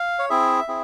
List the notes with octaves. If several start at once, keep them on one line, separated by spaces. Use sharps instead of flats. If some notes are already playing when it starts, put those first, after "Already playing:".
Already playing: F5
C#5
C4 E4 G#4 E5
C4 E4 G#4